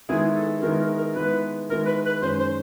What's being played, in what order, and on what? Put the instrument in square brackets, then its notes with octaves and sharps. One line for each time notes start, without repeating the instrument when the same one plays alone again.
[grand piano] D#3 G#3 B3 E4 [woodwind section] G#4
[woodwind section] A4
[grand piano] D#3 G#3 B3 E4 [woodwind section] A#4
[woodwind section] A#4
A#4
[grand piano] D#3 G#3 B3 E4 [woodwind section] B4
[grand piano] D#3 G#3 B3 E4 [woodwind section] A#4
[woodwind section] B4
B4
[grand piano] F#2 D#3 G#3 C#4 [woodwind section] C5
[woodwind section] C5